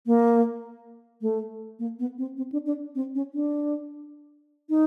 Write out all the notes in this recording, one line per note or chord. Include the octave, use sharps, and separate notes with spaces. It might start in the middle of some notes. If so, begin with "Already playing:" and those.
A#3
A3
A#3
B3
C4
C4
D4
D4
C4
C#4
D4
D#4